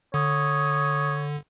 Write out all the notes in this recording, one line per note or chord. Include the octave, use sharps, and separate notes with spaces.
D3 C#5 D#6